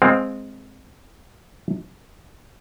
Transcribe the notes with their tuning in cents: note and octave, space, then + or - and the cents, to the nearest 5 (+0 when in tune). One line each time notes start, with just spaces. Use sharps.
G#3 +0 C4 +0 F5 +25